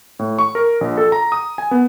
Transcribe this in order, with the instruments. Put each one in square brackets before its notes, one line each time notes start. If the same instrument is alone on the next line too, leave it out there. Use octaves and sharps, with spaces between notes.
[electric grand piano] A2
C#6
A#4
A#1
A4
A#5
D#6
G#5
B3